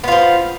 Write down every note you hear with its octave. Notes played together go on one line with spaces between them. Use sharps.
F3 B3 F4